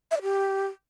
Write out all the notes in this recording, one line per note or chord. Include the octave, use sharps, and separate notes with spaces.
E5
D5
G4